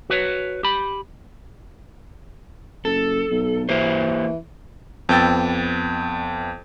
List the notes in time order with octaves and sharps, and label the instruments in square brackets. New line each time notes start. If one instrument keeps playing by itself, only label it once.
[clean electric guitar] F#4 B4 C#5
G4 B5
[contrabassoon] F#1 [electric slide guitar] A4
[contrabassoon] B1
[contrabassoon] E3 [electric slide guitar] A#3 G4 C5
[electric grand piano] F2 B3 G5 E6 A6